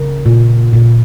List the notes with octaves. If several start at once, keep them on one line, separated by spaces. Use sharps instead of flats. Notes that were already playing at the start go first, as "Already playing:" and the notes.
Already playing: C#3 A#4
A#2
A#2